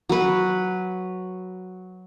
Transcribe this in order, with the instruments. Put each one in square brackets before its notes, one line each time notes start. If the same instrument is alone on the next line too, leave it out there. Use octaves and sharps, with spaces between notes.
[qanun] F#3 B4